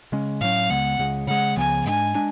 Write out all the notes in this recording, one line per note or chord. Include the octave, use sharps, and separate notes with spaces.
C#3 G#3 C#4
A2 F#3 C#4 F5
C#2 C#3 G#3 B3 F#5
C#2 C#3 G#3
C#3 F3 G#3 F#5
C#2 C#3 F3 B3 G#5
G#2 G#3 D4 G#5
G#3 D4